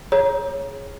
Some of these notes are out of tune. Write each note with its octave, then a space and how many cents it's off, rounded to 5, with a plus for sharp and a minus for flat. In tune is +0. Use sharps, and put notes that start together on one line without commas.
G#4 +0 C#5 -5 A#5 +20